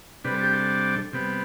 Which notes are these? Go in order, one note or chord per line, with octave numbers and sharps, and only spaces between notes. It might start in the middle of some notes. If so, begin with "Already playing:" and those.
C3 G3 D4 B4
A4
G4
A4
C3 G3 B3